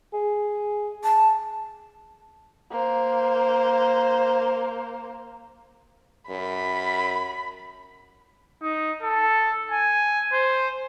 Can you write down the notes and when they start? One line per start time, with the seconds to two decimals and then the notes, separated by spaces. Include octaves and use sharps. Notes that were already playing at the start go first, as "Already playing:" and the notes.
0.13 G#4
1.04 A5
2.71 A#3 C5
6.29 F#2 B5
8.62 D#4
9.02 A4
9.71 G#5
10.33 C5